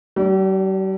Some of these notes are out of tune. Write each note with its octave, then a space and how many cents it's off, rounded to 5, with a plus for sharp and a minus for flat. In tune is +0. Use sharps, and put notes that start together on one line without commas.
G3 -45 D4 +0